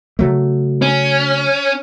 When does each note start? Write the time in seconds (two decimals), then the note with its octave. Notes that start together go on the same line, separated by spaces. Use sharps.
0.19 C#3 F#3 A3
0.82 C#4